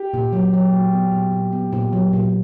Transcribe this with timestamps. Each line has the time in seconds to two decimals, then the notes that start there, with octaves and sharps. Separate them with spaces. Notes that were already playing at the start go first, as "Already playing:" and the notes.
Already playing: G4
0.14 A#2
0.33 F#3
0.53 F#3
0.73 A#2
0.92 B3
1.12 A#2
1.32 A#2
1.52 B3
1.73 A#2
1.93 F#3
2.13 A#2